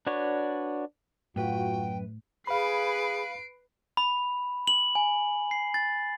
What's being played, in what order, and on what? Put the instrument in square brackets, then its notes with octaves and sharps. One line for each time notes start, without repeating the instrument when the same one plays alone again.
[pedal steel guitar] D4 F#4 B4 C#5 D5
[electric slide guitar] F#2 B4 [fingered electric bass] A2 [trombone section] F4 F#4 [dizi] G5
[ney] G#4 [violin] B4 [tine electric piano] F5 B5 [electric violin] C7 D7
[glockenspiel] B5
F#7
G#5
C7
A6